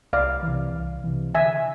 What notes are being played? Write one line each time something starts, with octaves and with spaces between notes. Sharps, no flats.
C2 D5 F5
C3 E3
C2
C3 E3
D3 E5 G#5